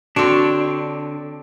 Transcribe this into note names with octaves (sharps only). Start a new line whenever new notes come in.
D3 C4 D4 F#4 C#5